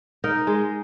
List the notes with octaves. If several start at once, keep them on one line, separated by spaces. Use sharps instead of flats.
D#4 A#4
G#3